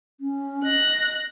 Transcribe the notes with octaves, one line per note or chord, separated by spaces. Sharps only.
C#4
D#5 F#6 A#6